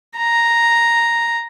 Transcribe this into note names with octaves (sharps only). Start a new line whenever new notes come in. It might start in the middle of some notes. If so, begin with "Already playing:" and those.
A#5